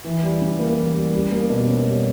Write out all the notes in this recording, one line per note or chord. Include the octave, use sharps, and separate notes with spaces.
E3
G3
C#3
A#3
E3
G3
G3
A#3
B2
C#4
G3